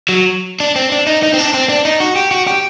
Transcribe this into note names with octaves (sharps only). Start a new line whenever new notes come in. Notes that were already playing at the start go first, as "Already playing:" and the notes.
F#3
D4
C4
D4
D#4
D#4
C4
D4
C4
D4
D#4
F#4
G4
F#4
G4